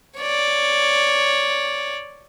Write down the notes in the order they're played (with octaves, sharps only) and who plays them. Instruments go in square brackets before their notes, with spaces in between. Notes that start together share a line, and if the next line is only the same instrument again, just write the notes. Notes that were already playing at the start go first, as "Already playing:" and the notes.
[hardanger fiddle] C#5 D5